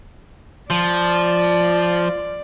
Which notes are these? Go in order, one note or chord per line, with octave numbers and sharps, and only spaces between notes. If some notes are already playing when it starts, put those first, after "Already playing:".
F3 D5